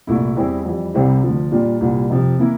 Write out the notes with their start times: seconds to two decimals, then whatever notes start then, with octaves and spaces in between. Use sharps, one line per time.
0.07 C2 A#2 A3 E4
0.36 E2 E3 G3 C4 E4
0.65 F2 E3 G3
0.94 C2 C3 G3 C4 E4
1.23 D2 D3 F3
1.51 A#2 G3 A#3 D4 F4
1.81 C2 A#2 G3
2.10 F2 C3 F3
2.39 E3 A#3 E4